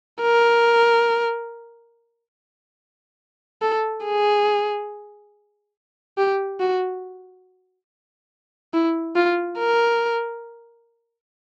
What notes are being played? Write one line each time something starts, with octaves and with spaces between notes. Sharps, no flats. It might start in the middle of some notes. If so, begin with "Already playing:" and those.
A#4
A4
G#4
G4
F#4
E4
F4
A#4